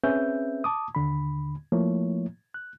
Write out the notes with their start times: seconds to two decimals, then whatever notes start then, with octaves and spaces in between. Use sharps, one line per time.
0.04 C4 C#4 G#4 B4 E5 G6
0.64 A5 D6 D#6
0.95 D#2 D3 B5
1.72 F3 A3 A#3 E4 C#5
2.54 F#6